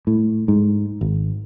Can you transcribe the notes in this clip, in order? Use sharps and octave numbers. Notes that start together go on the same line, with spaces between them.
A2
G#2
G#1